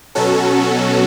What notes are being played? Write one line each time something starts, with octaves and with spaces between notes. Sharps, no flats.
B2 F#3 C#4 F#4 A4